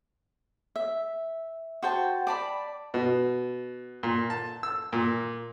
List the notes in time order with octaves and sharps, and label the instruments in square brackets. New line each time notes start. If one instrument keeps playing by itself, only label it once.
[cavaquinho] E5
F#4 C5 G5 A5
D5 A5 B5
[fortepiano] B2
A#2
A5
E6
A#2